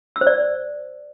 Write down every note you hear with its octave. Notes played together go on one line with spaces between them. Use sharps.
E6
C5
D5